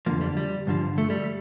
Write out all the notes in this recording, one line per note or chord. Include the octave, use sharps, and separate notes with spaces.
F2 D3 F3 A#3
G3
G3
G2 D3 F3
A3
G3